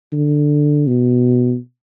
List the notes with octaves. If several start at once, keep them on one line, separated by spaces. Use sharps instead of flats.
D3
B2